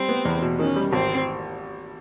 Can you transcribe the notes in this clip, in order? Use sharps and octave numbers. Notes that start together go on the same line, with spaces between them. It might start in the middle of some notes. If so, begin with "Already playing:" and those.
Already playing: G3 C4
B3
E2
B2
D#3 C#4
G3
G#1 C4